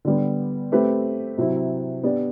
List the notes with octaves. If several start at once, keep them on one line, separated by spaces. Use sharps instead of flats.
D3 G3 B3
A3 C4 G4 B4
C3 F#3 C4 E4
B3 D4 G4 D5